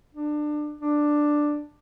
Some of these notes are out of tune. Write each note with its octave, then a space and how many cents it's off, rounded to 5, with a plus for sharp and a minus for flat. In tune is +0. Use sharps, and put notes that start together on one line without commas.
D4 +25
D4 +5